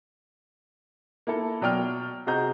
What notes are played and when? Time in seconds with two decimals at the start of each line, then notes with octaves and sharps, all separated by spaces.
1.27 A#3 E4 A4
1.61 B2 F#3 D5 G5 F6
2.27 C3 F#4 G#4 D#5 A#5 G6